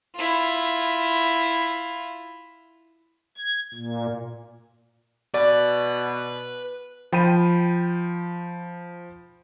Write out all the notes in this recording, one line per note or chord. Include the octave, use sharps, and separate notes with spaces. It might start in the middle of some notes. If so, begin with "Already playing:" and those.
E4 F4
G#6
A#2
B2 B4 D5
F3 G5 B5 D#7